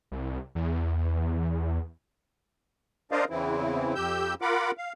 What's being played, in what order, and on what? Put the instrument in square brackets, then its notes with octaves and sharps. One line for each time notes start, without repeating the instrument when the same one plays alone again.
[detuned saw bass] C2
E2
[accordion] D4 A#4 C5 D5 D#5 F5
E2 C#3 E3 C4 E4
F2 G4 E6 G6
F4 A#4 F#5 B5 D6
F5